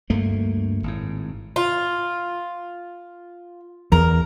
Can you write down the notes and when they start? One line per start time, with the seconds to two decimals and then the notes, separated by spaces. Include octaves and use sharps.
0.10 D2 G2 A3 A#3
0.84 G#1 A2
1.56 F4
3.92 E2 A#4